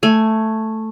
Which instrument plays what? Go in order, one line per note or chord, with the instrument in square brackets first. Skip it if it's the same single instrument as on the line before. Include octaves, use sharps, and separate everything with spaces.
[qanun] A3 G#5